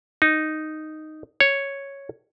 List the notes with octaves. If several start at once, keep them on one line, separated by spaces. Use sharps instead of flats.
D#4
C#5